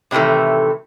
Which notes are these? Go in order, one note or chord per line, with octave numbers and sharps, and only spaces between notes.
A2 C3 D#3 E3 A3